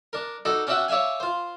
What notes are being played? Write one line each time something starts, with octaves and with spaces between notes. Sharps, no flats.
D4 A#4
D#4 F#4 A4 D5
C#4 D4 F#4 E5 F#5 G5
C#5 D5 E5 F5 G#5
F4 C5